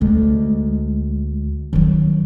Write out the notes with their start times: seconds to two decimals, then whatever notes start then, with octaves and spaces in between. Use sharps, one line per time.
0.01 D2 G#3
1.73 D#3 F#3